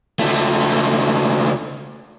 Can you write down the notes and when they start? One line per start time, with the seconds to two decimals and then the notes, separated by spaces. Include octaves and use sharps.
0.19 C#2 A3